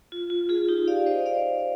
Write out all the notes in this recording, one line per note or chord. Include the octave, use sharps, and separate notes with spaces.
F4
F4
F4 G#4
D#4 G4
D5 F5
C5 D#5
D5 F5